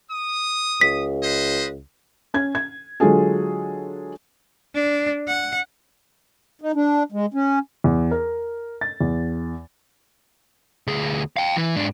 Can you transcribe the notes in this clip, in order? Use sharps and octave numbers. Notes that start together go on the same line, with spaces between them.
D#6
C#2 B6
B4 C5 D#5
C#4 G#6
G#6
D3 F#3 G#3 F4 G#4 A4
D4
F#5
D#4
D4
G#3
C#4
E2
A#4
A6
E2
D2 G#4
F5 G5
E3
G#2 D4